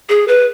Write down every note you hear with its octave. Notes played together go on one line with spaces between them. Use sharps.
G#4
B4